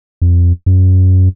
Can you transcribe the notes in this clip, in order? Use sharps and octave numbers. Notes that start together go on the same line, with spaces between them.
F2
F#2